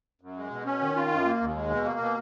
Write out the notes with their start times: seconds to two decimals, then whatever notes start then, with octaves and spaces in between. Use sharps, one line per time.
0.21 F#2
0.37 G#3
0.51 B2
0.65 C#4
0.81 D#3
0.96 F4
1.11 F#2
1.25 A#3
1.41 D#2
1.55 G#3
1.70 B2
1.85 A#3
1.99 B2